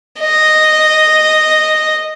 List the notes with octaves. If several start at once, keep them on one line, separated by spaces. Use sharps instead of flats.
D#5